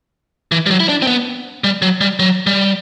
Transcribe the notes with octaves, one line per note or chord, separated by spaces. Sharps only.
E3
G3
F#3
E4
D4
C4
B3
G3
F#3
G3
F#3
G3